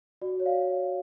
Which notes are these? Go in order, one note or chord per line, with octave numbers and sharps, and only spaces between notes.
F#4 D5
C#5
F5